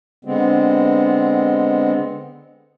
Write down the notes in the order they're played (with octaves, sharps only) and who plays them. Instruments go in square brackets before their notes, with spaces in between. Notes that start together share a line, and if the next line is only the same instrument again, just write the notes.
[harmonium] D3 G#3 B3 C4